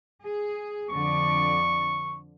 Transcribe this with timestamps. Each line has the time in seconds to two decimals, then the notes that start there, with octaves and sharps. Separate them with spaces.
0.23 G#4
0.91 F2 D3 D5 C#6